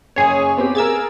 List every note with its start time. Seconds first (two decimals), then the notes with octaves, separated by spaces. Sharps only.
0.16 F#1 G#4 C#5 G#5
0.57 B3 C4 G4
0.75 G#4 A#4 E6 G#6 A6